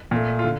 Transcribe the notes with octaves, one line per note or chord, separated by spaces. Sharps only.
A#2 A3
F4
D3